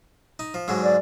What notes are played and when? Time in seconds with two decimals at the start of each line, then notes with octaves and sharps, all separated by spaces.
0.39 D#4
0.54 F3
0.68 G#2 D3 F#3
0.84 D5